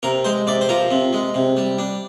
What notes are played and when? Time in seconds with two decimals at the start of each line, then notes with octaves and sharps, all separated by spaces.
0.03 C3 A#4
0.24 G#3 C5
0.47 C3 D5
0.61 C5
0.69 F3 A#4
0.91 C3
1.13 G#3
1.34 C3
1.57 G3
1.78 D4